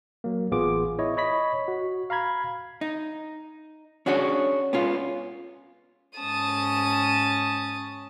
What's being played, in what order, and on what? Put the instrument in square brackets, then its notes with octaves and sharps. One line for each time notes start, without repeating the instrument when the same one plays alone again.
[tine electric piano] F#3 A#3
A1 B3 F4 G#4 D6
E4 C#5 D#5
C#5 D#5 B5 B6
F#4
F5 A#5 B5 G#6
[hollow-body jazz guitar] D#4
C#4 D4 F#4 G#4 C#5
B3 C#4 F4
[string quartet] G#2 C#4 A5 D#6